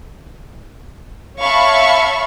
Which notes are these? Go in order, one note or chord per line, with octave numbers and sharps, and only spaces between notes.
C#5 E5 F5 A5 B5 C#6